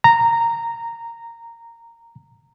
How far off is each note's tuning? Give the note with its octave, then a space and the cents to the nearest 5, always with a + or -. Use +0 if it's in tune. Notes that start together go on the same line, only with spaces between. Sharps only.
A#5 -10